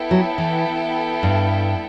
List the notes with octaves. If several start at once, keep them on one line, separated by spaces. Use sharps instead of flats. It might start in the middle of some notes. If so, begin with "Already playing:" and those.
Already playing: B3 E4 A4 E5 G5
F#3
E3
G2